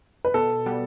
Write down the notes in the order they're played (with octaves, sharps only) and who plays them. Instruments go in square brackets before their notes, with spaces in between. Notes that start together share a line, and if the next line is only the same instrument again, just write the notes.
[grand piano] B4
[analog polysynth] B2 [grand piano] A4
[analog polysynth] G3 B3